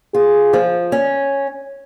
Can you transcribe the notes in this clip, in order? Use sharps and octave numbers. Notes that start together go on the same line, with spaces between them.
F4 G#4
F3
C#4